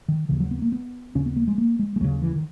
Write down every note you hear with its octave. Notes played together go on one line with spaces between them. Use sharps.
D#3
D#2 C#3 E3
F#3
B3
A#3
B3
D#2 C#3 C#4
B3
A#3
G#3
A#3
G#3
G#3
D#2 C#3 F#3
E3
D#3